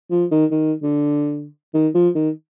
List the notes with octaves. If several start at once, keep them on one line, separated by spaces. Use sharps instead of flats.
F3
D#3
D#3
D3
D#3
F3
D#3